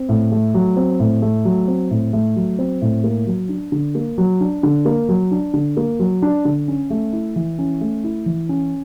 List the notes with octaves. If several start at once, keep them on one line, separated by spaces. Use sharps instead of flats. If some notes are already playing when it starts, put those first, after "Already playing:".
Already playing: C4
A2
A3
F#3
C4
A2
A3
F#3
C4
A2
A3
F#3
C4
A2
A#3
F#3
D4
D3
A#3
F#3
D4
D3
A#3
F#3
D4
D3
A#3
F#3
D4
D3
C#4
A3
E4
E3
C#4
A3
E4
E3
C#4